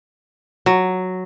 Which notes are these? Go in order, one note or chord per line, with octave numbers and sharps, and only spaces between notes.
F#3